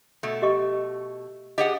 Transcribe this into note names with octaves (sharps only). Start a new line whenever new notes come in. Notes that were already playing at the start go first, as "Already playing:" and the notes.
B2 A3
G4 D#5 C#6
G4 G#4 D#5 F#5